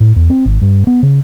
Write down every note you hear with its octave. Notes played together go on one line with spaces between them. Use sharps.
A2
E2
C4
G#1
G2
B3
C#3